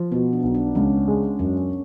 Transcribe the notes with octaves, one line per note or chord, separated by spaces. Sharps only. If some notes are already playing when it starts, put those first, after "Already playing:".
Already playing: F3
B2 B3
D4
B1
D4
C#2 C#4
G#3
F#2 C#4